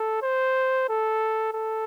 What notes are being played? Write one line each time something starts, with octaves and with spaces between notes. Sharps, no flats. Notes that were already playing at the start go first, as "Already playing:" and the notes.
Already playing: A4
C5
A4
A4